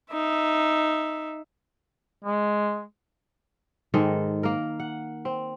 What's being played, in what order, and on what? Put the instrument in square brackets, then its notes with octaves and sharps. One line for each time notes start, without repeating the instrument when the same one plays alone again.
[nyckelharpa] D#4 E5
[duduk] G#3
[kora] G#2 D#3 G#3 A4
A#3 A#4
F#5
C4